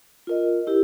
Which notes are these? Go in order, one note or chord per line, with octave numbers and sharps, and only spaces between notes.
F4 A#4 D#5
E4 G4 A#4